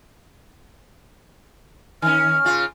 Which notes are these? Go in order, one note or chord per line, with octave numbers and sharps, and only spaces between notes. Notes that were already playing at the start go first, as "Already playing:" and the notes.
D#3 C#4 F6
C#3 F4